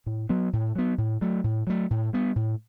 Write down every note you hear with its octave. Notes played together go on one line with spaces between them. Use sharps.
A2
F#3 B3
A2
F#3 B3
A2
F#3 A3
A2
F#3 A3
A2
G3 B3
A2